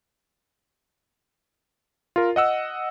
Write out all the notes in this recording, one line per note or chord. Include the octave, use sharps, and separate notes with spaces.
F4 A#4
D#5 F#5 E6